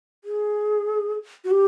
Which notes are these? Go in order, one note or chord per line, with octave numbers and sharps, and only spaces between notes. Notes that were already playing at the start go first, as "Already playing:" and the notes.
G#4
F#4
G4